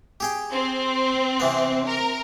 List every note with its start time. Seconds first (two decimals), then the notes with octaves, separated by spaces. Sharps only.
0.20 G4 G#4 G5
0.52 C4
1.40 C3 E3 B3
1.86 A#4